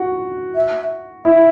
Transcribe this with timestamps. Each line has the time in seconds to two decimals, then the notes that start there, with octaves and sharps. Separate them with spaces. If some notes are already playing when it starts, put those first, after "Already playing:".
Already playing: F#4
0.55 E5
1.25 E4 E5